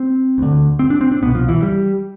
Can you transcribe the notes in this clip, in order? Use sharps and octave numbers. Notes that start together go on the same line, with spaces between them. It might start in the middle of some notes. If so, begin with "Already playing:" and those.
Already playing: C4
D2 D3
C4
D4
C4
D4
C2 B2 B3
F3
E3
G3